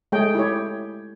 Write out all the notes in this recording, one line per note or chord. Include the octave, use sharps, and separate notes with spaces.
G#3 A3 G#4 C#5 G5
E4 G4 C#5